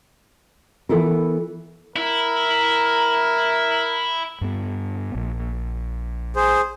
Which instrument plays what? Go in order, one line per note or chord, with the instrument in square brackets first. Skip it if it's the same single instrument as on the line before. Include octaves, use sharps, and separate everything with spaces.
[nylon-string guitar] E3 B3 E4 A4 A#4
[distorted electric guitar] E4 [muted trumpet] A#4
[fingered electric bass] G2 B3
A#1
[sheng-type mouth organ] G#4 C5